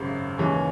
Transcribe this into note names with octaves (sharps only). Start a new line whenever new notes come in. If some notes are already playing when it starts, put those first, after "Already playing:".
Already playing: G#1 F#2 C#3
D#2 C#3 E3 G#3 C#4